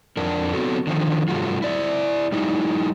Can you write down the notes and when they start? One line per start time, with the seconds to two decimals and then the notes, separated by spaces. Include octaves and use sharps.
0.17 F2 D4 A#4
0.53 B3 C4 F#4 A4
0.87 D3 D#3 F3
1.28 G2 C3 G3 A3 F4 F#4
1.62 E4 D5 E5
2.32 G3 D#4 E4